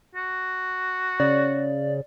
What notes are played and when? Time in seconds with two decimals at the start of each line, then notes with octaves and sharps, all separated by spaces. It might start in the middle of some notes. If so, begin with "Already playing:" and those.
0.15 F#4
1.20 C#3 D5